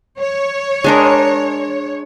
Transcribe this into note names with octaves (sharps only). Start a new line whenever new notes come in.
C#5
G#3 D4 A#4